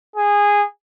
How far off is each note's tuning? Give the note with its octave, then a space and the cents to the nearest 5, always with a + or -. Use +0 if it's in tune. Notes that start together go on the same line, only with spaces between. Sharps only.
G#4 -15